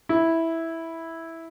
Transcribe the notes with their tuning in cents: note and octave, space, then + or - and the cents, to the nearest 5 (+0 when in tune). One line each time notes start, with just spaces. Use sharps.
E4 -5